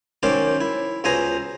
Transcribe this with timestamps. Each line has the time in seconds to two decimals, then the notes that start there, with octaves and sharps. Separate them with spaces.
0.23 F#2 D#3 C#4 C5 D5 D6
0.61 E4
1.04 C#2 B2 C5 G#5 A#5 D#6